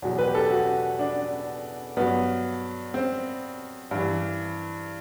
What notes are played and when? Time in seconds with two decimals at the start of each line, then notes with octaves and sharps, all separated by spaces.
0.02 E2 B2 F#3
0.18 B4
0.27 G4
0.35 A4
0.51 F#4
0.99 D4
1.97 G2 F#3 B3
2.94 C4
3.91 G2 E3